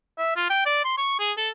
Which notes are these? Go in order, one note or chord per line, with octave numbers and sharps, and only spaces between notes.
E5
F4
G5
D5
C6
C#6
G#4
A4